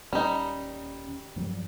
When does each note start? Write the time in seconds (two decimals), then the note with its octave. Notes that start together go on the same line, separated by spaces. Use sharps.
0.13 D#1 G3 C#4 D#4
1.36 G2 F3 F#3